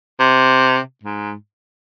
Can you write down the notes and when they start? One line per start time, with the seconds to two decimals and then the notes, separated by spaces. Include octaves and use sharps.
0.20 C3
1.04 G#2